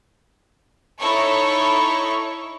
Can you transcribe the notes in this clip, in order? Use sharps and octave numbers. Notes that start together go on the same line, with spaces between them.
D#4 E4 A4 C#5 C#6